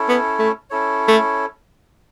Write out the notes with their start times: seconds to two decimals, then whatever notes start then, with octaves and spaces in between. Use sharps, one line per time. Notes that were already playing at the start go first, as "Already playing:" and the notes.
Already playing: C#4 E4 A4 C#5
0.08 B3
0.39 A3
0.70 C#4 E4 A4 C#5
1.08 A3